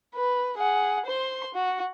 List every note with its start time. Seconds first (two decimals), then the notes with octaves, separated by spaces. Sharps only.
0.15 B4
0.58 G#4 F#5
1.06 C5 C6
1.54 F#4